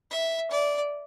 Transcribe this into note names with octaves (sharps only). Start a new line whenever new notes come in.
E5
D5